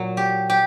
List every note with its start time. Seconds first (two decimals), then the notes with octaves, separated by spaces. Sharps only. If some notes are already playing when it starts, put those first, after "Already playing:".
Already playing: A#2 F#3
0.17 G4
0.50 G4